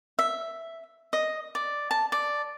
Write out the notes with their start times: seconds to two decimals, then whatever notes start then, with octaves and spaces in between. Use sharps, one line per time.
0.19 E5
1.13 D#5
1.55 D5
1.91 A5
2.12 D5